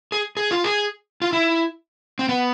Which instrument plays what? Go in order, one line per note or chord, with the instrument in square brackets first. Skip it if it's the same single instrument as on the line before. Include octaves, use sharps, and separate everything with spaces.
[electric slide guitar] G#4
G#4
F4
G#4
F4
E4
C4
B3